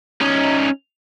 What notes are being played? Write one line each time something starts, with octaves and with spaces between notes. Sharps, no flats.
C#4 D#4